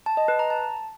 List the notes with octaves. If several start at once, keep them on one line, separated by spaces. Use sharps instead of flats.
A5
D#5
B4
A#5
A5